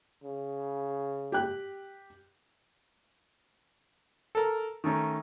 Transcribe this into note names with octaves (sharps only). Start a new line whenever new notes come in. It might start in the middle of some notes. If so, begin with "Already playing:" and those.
C#3
G4 G5 F#6
A4 A#4
D#3 A3 C#4 D#4